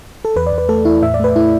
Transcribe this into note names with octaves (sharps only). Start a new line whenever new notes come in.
A4
E2 B4
D5
E2
B4
A3 A4
E2 E4
A2 E5
D5
A3 B4
A3 E4